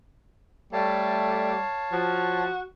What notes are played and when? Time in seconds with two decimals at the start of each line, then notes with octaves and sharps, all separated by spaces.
0.73 G3 A3 C#5 F5 A5
1.93 F3 F#4